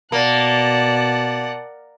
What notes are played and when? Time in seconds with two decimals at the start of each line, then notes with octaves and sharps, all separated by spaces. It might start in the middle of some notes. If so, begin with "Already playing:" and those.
0.12 B2 A#3 D5 F#5 A5